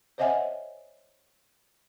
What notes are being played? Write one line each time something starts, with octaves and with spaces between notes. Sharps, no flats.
C5 C#5 D#5 E5 F#5 G#5